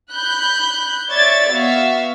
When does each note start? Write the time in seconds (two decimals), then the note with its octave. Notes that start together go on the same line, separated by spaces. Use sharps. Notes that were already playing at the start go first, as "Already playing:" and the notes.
0.13 B5 F#6 G6
1.10 C#5 D5 E5 G#6 A6
1.52 B3 F#4 E5 F5